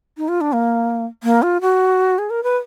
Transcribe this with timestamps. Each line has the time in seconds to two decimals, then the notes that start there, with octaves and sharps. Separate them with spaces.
0.17 D#4
0.28 F4
0.41 D4
0.53 A#3
1.24 A#3
1.42 F4
1.61 F#4
2.18 G#4
2.30 A#4
2.43 B4